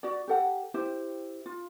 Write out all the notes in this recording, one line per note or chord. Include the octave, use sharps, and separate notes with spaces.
F#4 D5
G4 A4 F#5
E4 G4 C5 E5
F4